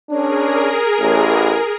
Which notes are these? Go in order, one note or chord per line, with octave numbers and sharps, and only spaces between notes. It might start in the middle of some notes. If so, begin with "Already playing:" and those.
C#4 D4 G#4 A#4
A1